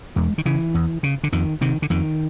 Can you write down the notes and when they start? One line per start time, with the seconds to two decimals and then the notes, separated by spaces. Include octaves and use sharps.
0.16 E2 G#3
0.38 D#3
0.46 C#3 E3
0.74 E2
1.03 C#3
1.23 D3
1.32 F2 D#3
1.61 C3 D#3
1.82 D3
1.90 F2 D#3